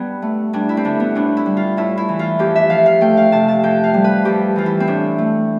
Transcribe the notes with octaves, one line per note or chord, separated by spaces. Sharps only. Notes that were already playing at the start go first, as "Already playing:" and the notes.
Already playing: G2 B3
A3
G2 D4
E4
C4
D3 D4
B3
A2 D4
E4
G3
F4
A2 E4
E4
E3
F4
F2 G4
E5
F3 F5
F5
A3 G5
F5
C3 A5
A5
F2 G5
F5
G3
B4
F2 G4
E3 F4
E4
C4
A2 D4
A3